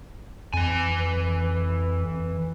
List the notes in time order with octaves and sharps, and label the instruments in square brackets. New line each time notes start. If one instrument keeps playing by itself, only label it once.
[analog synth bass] F2 [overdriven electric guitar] E3 G#5